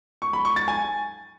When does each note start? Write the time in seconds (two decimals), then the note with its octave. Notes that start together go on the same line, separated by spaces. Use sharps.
0.22 C#6
0.33 B5
0.45 C#6
0.56 A6
0.68 G#5